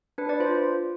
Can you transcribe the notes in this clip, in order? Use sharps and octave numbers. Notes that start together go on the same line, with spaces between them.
D4 B4
B4 D5
F4 C5